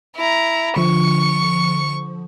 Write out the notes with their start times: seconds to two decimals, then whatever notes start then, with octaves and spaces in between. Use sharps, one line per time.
0.16 E4 A#5
0.76 D3 F3 C#6 C#7